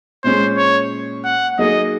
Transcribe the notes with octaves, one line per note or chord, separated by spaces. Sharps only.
A#2 G#3 C#4 C5
C#5
F#5
F#3 A#3 D#4 G#4 D#5